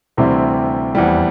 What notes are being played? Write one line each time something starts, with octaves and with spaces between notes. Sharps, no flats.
D2 C3 E3 G3 C4
F1 E2 E3 G3